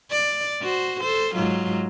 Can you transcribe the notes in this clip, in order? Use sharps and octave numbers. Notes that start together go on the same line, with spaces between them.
D5
F#4 C5
A4 C5
G#2 F#3 F4